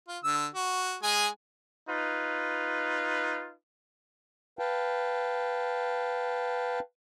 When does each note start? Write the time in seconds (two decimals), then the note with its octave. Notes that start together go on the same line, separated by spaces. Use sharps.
0.08 F4
0.24 D3 E6
0.55 F#4
1.03 G#3 G#4 G#5
1.89 D#4 F4 B4
4.59 B4 F5 G5 A5